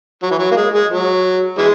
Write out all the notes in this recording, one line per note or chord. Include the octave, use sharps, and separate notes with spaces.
F#3
E3
F#3
A#3
G#3
G#3
F#3
E3 G#3